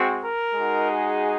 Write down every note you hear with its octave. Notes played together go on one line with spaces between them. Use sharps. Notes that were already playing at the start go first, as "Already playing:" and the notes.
Already playing: G#3 C4 F#4
A#4
G#3 D#4 F#4
G#4